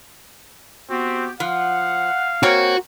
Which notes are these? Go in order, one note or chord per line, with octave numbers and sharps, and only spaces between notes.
B3 C4 F#4 G4
F3 F5 F#5
A#3 C4 F#4 C#5